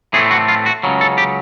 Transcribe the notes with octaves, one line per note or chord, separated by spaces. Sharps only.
A2 E3 A3 C4 G#4
F#4
F4
F#4
C#2 C#3 F#3
A4
G4